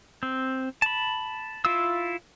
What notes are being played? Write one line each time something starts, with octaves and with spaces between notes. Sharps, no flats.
C4
A5 B5
E4 F4 F5 E6